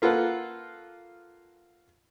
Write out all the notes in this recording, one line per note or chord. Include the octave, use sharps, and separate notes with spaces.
A#3 F4 A4 B4 F#5